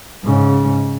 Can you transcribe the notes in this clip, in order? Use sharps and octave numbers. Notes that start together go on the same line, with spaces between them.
G#2 C#3